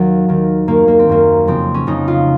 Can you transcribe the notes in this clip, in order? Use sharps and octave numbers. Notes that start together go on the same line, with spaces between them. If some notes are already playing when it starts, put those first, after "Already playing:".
Already playing: D#2 D#3 F#3
D#2 D#3
F#2 D#3 A#3
A#3
C4
F#2 D#3 A#3
F2 C#3 C4
C#4
F2 C#3 D#4
F4